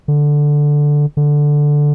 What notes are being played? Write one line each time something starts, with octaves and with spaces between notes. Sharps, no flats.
D3
D3